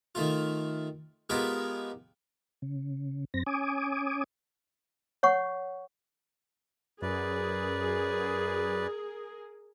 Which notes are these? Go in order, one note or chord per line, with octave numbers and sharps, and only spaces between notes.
D#3 A3 F4
G#3 B3 F4 G4 A#4 B4
C#3
F#2 C4 A#6
C#4 G#5 D6 D#6
C#5 F#5 C#6
F#2 G#4 A#4 B4 D5